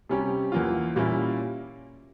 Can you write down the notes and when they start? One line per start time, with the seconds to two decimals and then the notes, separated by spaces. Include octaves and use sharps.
0.09 C3 G3 C#4 G4
0.52 E2 E3 A#3 F4
0.96 A#2 G3 A#3 C#4 E4